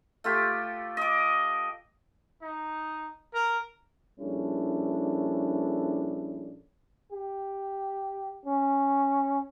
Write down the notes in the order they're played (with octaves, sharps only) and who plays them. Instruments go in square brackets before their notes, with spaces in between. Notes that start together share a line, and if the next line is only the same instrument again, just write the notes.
[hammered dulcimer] A3 F4 G4
D#5 D6
[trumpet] D#4
A#4
[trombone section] A#1 G3 C#4 D4 E4 A4
[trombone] G4
C#4